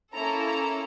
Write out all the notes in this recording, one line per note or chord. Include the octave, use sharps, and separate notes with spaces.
A#3 C#4 E4 A4 A#5
A#5